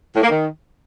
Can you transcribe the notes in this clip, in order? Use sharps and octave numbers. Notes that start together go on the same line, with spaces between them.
A2
A#3
D#3